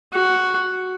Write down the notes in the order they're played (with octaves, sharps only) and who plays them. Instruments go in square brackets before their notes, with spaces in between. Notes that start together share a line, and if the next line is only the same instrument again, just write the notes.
[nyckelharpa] F#4